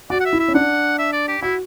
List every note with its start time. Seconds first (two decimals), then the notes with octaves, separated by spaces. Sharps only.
0.10 F#4 D5
0.20 F#5
0.25 E5
0.33 E4
0.39 E5
0.48 C#4
0.55 D4 F#5
0.98 E5
1.13 D5
1.28 G4
1.42 E4 F#4